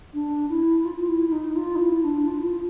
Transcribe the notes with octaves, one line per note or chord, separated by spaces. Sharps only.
D4
E4
F4
F4
E4
E4
D#4
F4
D#4
E4
D4
F4
E4
F4